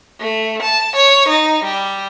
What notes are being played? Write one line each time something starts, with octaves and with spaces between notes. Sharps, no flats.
A3
A5
C#5
D#4
G3